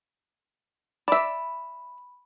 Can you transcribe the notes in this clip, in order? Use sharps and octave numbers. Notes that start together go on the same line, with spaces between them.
D5 E5 B5